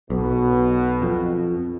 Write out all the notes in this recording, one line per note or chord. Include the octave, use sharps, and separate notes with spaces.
B1 B2
F2